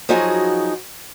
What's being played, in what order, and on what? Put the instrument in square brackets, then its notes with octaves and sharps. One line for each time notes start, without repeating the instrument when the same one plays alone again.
[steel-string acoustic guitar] F3 F#3 D#4 F#4 G#4 D#5